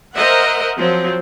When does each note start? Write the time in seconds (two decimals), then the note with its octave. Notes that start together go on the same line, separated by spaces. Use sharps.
0.15 A#4 C5 D#5 E5 F#5
0.76 F3 F#3 C4